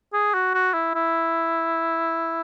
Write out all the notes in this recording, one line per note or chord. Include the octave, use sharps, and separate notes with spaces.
G#4
F#4
F#4
E4
E4